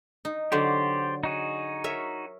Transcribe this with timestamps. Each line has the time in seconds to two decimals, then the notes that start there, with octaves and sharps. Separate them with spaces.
0.25 D#4
0.52 D3 F#3 G4 C5 D5
1.23 D#4 F#4 G#4
1.84 A#4 C#5 E5